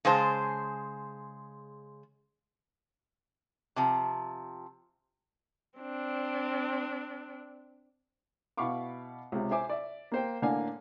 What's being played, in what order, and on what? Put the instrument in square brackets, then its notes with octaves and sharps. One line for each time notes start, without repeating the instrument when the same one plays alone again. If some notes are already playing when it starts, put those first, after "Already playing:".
[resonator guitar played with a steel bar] C#3 G#3 G#4 C5 A5
C3 F3
[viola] C4 D4
[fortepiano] B2 E4 F5 B5 C#6 D6
C#2 C3
C5 E5 G#5 D6
D5 E5
A#3 C5 G5
A2 D3 A#3 D5 F5 G#5